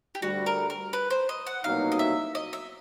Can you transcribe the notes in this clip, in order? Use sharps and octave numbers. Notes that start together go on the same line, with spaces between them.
G4
D2 D3 G3 F#4
A#4
A#4
B4
C5
D#5
F#5
C2 B2 F#3 A#3 D#4 F5
D#5
E5
D#5
E5